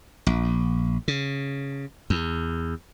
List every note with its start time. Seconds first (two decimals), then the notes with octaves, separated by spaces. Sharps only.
0.27 A#1
1.08 C#3
2.10 E2